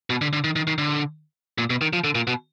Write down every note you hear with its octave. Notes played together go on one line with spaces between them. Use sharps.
B2
D3
D3
D#3
D#3
D#3
D3
A#2
B2
D#3
F3
D3
A#2
B2